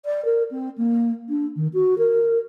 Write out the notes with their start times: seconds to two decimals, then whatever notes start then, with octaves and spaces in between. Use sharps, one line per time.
0.05 D5
0.25 A#4
0.51 C4
0.78 A#3
1.29 D4
1.56 D#3
1.73 F#4
1.98 A#4